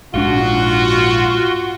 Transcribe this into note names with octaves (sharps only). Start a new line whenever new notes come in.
A#1 G#2 D4 F4 F#4